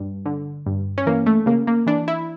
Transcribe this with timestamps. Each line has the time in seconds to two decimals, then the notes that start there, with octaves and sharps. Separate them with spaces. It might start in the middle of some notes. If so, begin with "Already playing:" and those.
Already playing: G2
0.26 D3
0.66 G2
0.98 C#4
1.06 E3 A#3
1.26 A3
1.46 C#3 A#3
1.67 A#3
1.86 E3 D4
2.08 E4